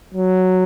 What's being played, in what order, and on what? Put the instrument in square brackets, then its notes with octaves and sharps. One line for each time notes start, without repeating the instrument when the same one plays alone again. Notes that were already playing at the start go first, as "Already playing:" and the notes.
[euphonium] F#3